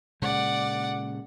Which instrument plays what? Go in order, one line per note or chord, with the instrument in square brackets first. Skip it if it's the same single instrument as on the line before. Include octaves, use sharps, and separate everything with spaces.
[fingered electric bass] A#2 C#3 G#3 [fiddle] D5 F#5